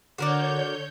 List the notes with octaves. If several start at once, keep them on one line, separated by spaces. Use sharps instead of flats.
D3 F#4 A#4 C#5 D5 G6